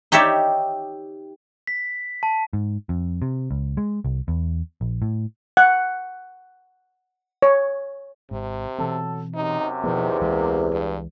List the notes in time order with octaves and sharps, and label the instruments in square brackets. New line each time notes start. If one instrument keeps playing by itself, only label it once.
[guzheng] D#4 G4 C#5 D5 E5
[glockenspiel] B6
A5
[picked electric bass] G#2
F2
C3
C#2
G#3
C2
E2
A#1
A2
[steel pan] F#5
C#5
[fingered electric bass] G#1 G#2 [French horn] C3
[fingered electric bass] B2 E3 C4 [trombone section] F#3 A4
[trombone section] F#2 C3 [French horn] D#4
[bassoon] E2 [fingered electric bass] B2 F3 B3 [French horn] D#3
[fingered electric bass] C#2 E3 G#3 [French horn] A#3
[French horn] G2